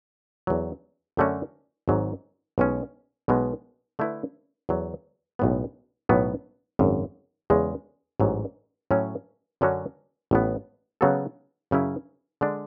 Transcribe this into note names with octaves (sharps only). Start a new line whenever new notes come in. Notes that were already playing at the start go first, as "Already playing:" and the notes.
E2 D3 F#3
F#2 D3 A3 C#4 F#4
G#1 G#2 F#3
B1 B2 G#3 C#4
B1 B2 G#3 B3
D3 A3 E4 B4
E2 D3 F#3
B1 A2 G#3 B3
B1 A2 F#3 B3
G#1 F#2 C#3
E2 C#3 G#3 C#4
A1 G#2 F#3
A2 F#3 C#4 E4
F#2 D3 F#3 C#4 F#4
A1 A2 F#3 B3
C#3 F#3 B3 F#4 A4
F#2 C#3 F#3 C#4 E4
D3 G#3 D4